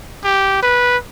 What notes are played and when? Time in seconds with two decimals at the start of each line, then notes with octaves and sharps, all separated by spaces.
0.24 G4
0.62 B4